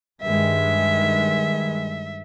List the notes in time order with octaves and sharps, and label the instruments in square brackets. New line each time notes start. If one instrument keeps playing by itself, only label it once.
[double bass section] G2 D#3 G#3 [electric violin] E5